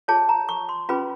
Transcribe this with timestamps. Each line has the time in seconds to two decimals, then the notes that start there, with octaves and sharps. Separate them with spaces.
0.08 F4 G#4 C#5 A5
0.29 A#5
0.49 C#6
0.69 C6
0.89 C#4 F4 G#4 B4 B5